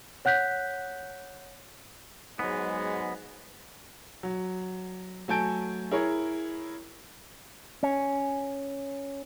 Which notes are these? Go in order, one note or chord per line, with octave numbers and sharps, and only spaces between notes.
C#5 F#5 F#6 G6 B6
G#2 F#3 G#3 B3
F#3
F#3 A3 G#5 A5 G6 D7
E4 G#4 A#4 C#5
C#4